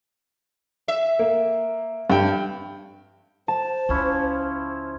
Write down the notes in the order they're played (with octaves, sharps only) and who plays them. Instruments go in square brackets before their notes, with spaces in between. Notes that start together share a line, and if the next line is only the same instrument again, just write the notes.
[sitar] E5
[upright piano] A#3
G2 G5
[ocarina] C5 [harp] A5
[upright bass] C#2 [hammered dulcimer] F3 C#4 E4